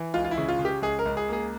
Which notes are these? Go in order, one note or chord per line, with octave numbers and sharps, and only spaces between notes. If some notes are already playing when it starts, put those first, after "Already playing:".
Already playing: E3
C#2 F4
F4
E4
C#3
F4
C#3
G4
C#2 G#4
A#4
C#2
G#4
A#3 G#4